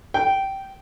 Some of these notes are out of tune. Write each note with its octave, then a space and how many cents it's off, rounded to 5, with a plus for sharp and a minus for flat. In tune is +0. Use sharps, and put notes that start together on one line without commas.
G5 -15